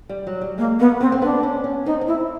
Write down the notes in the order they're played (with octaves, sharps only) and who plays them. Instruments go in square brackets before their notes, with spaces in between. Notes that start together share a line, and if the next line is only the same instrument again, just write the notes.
[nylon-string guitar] G3
F#3
G3
[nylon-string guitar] G#3 [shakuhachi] A#3
[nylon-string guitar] A#3 [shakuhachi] B3
[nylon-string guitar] B3 [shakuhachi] C4
[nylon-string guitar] C4
[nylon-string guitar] B3 [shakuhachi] D4
[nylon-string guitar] C#4
C#4
[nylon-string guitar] C4 [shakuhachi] D#4
[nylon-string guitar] C4
[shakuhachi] E4